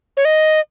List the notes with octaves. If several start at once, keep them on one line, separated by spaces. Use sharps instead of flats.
C#5
D#5